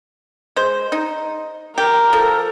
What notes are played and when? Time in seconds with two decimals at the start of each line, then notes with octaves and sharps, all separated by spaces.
0.56 G#3 C5
0.92 D#4
1.78 G4 A#4
2.13 F3 A4